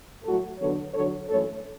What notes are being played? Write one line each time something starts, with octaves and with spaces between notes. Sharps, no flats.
A2 F#3 A3 F#4 A4
E2 D3 F#3 B3 A4 C#5
E2 D3 F#3 A4 C#5
F#2 E3 A3 A4 C#5